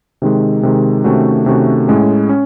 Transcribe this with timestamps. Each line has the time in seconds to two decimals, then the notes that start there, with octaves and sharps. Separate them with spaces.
0.22 C3 D#3 G#3
0.63 C3 D#3 G#3
1.04 C3 D#3 A3 C#4 F#4
1.46 C3 D#3 A3 C#4 F#4
1.88 A2 G#3 C#4
2.29 C#4